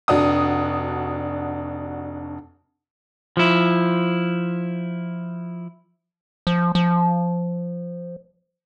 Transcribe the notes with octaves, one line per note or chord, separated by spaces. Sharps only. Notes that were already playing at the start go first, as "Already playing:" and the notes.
F1 D4 F#4 D#6
F3 E4
F3
F3